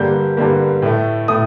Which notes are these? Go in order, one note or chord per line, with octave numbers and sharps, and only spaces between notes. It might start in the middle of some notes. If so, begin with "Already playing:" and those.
Already playing: G2 D3 G3 A#3 G6
G2 D3 G3 A#3
A2 A3
A2 A3 D#6